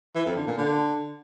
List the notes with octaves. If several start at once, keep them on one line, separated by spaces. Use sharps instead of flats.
E3
F2
D3
A#2
D3